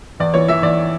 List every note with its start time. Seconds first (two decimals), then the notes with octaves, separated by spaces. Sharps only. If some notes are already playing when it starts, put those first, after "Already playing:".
0.20 E2 D5
0.34 E3 C#5
0.48 E3 E5
0.63 E2 D5